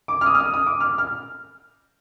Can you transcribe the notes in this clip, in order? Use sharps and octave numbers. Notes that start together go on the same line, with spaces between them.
D6
F6
D#6
F6
D#6
D#6
D6
F6
F6